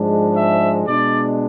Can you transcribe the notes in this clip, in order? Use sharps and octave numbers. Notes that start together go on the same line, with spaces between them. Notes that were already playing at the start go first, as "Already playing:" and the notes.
Already playing: G#2 F3 G#3 D4
E5
B2 G#3 D4 D5